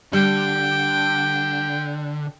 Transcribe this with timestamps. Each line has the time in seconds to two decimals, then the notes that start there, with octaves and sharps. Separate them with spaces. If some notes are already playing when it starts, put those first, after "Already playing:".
0.13 D3 G3 G5